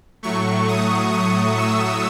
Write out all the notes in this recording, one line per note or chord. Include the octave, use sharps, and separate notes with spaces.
A2 F#3 A3 C#6
D#6
D#6
E6